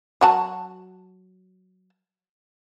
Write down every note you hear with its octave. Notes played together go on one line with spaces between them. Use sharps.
F#3 F#4 A5